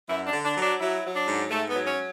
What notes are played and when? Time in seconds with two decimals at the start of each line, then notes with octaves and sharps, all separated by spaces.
0.09 F#2 E4
0.27 D4
0.33 D3
0.45 D4
0.57 F#3
0.62 D4
0.80 F#3 E4
1.04 F#3
1.15 D4
1.28 G#2
1.50 G#2 A3
1.68 B3
1.74 F#3
1.86 C#4